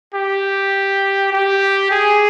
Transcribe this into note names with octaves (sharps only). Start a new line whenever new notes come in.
G4
G4
G#4